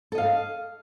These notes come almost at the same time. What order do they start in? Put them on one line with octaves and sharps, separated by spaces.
A4 D#5 F5